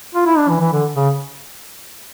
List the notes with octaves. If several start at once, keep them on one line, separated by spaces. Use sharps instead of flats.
F4
E4
D4
E3
E3
D3
C#3